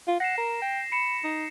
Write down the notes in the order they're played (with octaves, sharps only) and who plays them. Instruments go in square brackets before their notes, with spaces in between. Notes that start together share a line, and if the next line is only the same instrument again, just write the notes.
[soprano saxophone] F4
[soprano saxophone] F#5 [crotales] A#6 C7 E7
[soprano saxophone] A#4
G5
[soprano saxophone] B5 [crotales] C#7 E7
[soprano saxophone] D#4